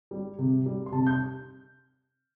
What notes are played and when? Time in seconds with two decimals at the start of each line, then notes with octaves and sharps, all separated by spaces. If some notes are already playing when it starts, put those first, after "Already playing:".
0.11 G3
0.39 C3
0.66 G3
0.86 C6
0.92 C3 A5
1.07 G6